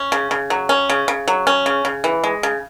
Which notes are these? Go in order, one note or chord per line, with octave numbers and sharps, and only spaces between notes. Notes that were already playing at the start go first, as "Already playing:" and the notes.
Already playing: C#4
C#3
C#3
F#3
C#4
C#3
C#3
F#3
C#4
C#3
C#3
E3
G#3
C#3